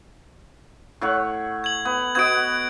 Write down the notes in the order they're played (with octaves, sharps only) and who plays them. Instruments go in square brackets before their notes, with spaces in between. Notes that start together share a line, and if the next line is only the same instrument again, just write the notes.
[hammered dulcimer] A2 C#5 F#5
[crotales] G#6 F#7
[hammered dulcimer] B3
[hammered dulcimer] B3 F#4 D#5 [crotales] G#6 D7